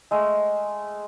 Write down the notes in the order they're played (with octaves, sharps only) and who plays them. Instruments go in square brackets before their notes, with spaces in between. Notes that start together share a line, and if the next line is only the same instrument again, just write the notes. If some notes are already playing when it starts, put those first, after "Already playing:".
[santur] G#3 A3